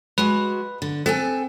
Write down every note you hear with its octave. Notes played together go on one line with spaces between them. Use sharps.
G#3 F#4 B4
D3
C4 A4 G5 G#5